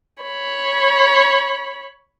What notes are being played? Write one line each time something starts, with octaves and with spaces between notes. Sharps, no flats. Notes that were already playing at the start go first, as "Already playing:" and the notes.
C#5 B5